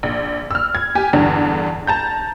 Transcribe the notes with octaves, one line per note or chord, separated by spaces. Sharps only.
A#1
E6 F6
G#6
G4 G#5
E2 G2 D3
A5 A#5 G6